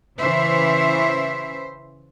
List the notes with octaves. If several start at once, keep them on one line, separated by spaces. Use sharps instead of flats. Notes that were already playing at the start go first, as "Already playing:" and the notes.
C#3 E3 C5 E5